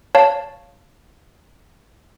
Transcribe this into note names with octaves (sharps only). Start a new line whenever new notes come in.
C#5 F5 A5